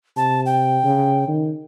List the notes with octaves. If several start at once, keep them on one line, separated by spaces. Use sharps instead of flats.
C3 A5
G5
C#3
D#3